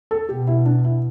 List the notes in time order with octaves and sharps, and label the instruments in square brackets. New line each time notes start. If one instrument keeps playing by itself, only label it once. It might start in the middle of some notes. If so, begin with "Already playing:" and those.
[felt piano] A4
[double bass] B2 [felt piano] G4
[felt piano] E4
D4
E4